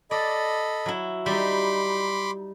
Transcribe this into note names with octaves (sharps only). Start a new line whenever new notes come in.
A4 D5 D#5 B5
F#3 E4
G3 D#4 B5 C6 D6